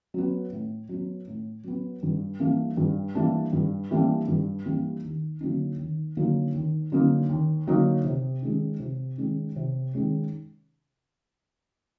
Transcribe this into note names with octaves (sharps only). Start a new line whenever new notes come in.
F#3 B3
A2
F#3 B3
A2
F#3 B3
G2
E3 G3 A#3 D4
G2
E3 G3 A#3 D4
G2
E3 G3 A#3 D4
G2
E3 G3 A#3 D4
D#2
D3 F#3 A#3 D#4
D#2
D3 F#3 A#3 D#4
D#2
D3 F#3 A#3 D#4
D#2
D3 F#3 A#3 D#4
C3
D#3 G#3 C#4
C3
D#3 G#3 C#4
C3
D#3 G#3 C#4